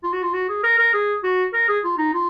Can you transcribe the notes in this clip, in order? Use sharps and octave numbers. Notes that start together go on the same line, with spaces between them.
F4
F#4
F4
F#4
G#4
A#4
A#4
G#4
F#4
A#4
G#4
F4
D#4
F4